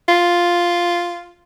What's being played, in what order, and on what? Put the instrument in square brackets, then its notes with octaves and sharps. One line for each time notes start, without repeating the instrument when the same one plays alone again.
[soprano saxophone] F4